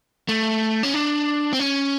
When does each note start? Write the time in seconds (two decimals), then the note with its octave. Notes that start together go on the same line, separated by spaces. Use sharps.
0.29 A3
0.83 C#4
0.94 D4
1.53 C4
1.60 C#4